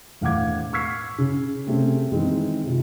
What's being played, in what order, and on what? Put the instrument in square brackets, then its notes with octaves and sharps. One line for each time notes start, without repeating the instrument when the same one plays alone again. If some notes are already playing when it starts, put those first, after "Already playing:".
[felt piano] E1 A2 F5 F#5 D6 G#6
C#6 E6 F6 G#6 B6 C7
C#3
C3 G3 A3 C4 C#4 G#4
D#3 E3 G#3 C4
C3 F4